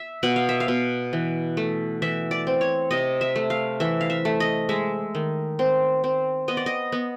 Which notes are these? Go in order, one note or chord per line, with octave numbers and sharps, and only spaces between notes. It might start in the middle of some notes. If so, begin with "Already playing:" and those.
Already playing: E5
B2 F#5
F5
E5
F5
B2
E3
A3
E3 E5
D5
C4
C#5
C3 D#5
E5
A3
F5
E3 E5
F5
E5
A3
D#5
G#3 E5
D#3
C4
C4
B3 D#5
D5
D#5
B3